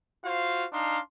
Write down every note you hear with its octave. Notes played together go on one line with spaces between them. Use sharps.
F4 F#4 C5 F5
D4 D#4 F5 A#5 C6